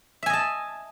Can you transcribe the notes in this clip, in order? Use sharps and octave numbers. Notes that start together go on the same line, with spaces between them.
D#5 E5 G#5 A5